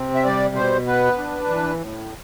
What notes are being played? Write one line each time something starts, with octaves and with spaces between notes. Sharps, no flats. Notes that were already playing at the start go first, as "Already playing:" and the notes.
Already playing: C3 C4
E5
G3 D5
B2 C5
B3 B4
D4
E3
A2